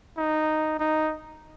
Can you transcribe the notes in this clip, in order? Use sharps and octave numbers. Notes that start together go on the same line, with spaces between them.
D#4
D#4